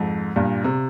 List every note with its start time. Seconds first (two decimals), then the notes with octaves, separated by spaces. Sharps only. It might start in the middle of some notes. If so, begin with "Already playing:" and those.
Already playing: F2 G#2
0.36 G2 A#2
0.64 C3